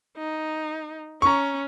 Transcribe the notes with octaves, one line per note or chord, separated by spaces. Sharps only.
D#4
C#4 A#5 C#6